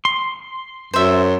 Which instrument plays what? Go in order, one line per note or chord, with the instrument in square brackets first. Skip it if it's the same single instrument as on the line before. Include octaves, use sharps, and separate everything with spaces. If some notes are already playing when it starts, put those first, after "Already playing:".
[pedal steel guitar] C6
[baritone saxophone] F#2 [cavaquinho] C5 E5